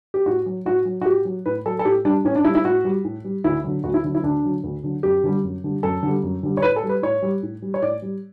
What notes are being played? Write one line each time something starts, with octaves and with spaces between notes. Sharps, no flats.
G4
A2 F#4
F#3
A2 F#4
F#3
F#4
A2 G4
F#3
A2 B4
F#3 A4
A4
A2 G4
G3 D4
A2 C#4
D4
G3 E4
E4
A2 F#4
G3
A2
G3
D2 E4
D3 F#3
D2 F#4
E4
D3 F#3
E4
D2 D4
D3 F#3
D2
D3 F#3
F#2 G4
D3 G3
F#2
D3 G3
F#2 A4
D3 G3
F#2
D3 G3
C#5
A2 B4
A4
G3
B4
A2 C#5
G3
A2
G3
C#5
A2 D5
G3